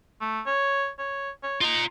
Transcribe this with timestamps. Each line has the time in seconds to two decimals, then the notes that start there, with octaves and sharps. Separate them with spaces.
0.21 A3
0.46 C#5
0.99 C#5
1.43 C#5
1.61 D#4 F4 A#5